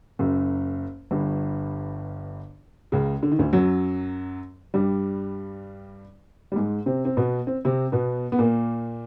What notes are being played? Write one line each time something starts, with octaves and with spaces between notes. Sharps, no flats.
F#1 F#2
G1 G2
C#2 C#3
D3
D#3
D2 D3
F#2 F#3
G2 G3
G3
G#2 G#3
C3 C4
C4
B2 B3
C4
C3 C4
B2 B3
B3
A#2 A#3